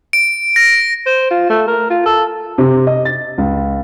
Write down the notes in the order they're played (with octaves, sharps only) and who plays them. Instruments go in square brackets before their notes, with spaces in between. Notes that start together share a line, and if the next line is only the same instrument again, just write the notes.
[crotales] D7
A#6
[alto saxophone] C5
F4
A3
A#4
F4
A4
[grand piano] C3
D#5
A6
C#2